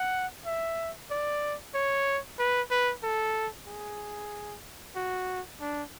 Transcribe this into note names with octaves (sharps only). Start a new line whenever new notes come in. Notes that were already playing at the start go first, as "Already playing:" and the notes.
Already playing: F#5
E5
D5
C#5
B4
B4
A4
G#4
F#4
D4